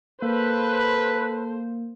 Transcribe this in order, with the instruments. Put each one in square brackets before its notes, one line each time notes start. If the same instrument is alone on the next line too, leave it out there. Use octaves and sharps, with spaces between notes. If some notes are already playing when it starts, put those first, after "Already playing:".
[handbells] A#3 [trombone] A4 [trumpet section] B4 [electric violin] C5